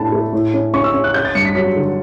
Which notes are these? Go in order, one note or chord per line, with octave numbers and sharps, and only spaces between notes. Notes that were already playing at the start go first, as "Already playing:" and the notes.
Already playing: A2 A3 D4 A5 B5
A3
A2
C#4
C#4 C#6
E6
C#4
F#6
C#4 G6
A6
G2 C#7
B6
F#3 B6
D3